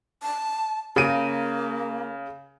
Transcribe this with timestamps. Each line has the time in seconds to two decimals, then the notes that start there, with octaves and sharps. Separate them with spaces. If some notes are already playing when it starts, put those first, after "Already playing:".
0.22 A5
0.96 C#3 A#3 D7 D#7